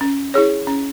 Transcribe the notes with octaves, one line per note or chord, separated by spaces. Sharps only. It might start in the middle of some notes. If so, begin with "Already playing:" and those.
C#4
E4 G#4 C#5
C#4